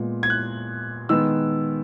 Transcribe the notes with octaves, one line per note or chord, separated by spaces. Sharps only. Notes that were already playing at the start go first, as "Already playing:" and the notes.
Already playing: A#2 G#3 B3
G#6
F#6
D#3 G#3 B3 E6